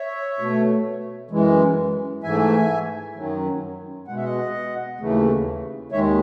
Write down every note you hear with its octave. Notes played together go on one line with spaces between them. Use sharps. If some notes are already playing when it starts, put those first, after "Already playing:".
Already playing: C#5 E5
B2 A3
F#2 E3 G#3
G#2 E3 A3 E5 G#5
F#2 D#3 F#3
B2 G#3 F#5
E5
D#5 F#5
D#2 C#3 E3 A3
D#2 D#3 G#3 C#5 E5